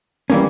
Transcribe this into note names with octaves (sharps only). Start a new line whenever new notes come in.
E3 G3 A#3 C#4